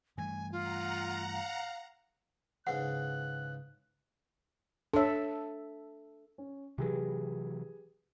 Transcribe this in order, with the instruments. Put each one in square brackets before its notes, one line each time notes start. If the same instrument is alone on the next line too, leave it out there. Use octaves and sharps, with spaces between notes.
[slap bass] G2 E3 A3 [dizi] G#5
[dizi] F4 [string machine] F#5 A#5
[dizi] F5
[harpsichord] G#2 C#3 E3 [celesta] F#5 [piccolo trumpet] F#6
[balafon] D4 C#5 [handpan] A4 E5
[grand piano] C#4
[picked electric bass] C3 E3 F#3 [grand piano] G4 G#4 B4